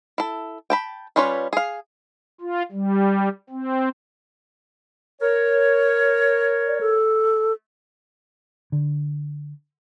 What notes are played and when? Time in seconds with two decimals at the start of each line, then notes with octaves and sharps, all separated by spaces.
0.18 E4 A4
0.70 G5 A5 B5
1.16 G3 C#4 F4 B4 C#5
1.53 G#4 F5
2.41 F4
2.72 G3
3.50 C4
5.22 A#4 C#5
6.67 D5
6.81 A4
8.72 D3